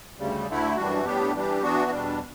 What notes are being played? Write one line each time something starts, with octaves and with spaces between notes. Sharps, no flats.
D2 C#3 G3
D2 D3 A3 E4
F#2 E3 G3 D4 F#4
A2 G3 B3 D4 G4
E3 G3 D4 G4
E3 B3 D4 F#4
E2 B2 G3 D4